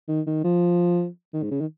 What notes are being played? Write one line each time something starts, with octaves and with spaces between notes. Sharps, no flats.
D#3
D#3
F3
D#3
G#2
C#3
D#3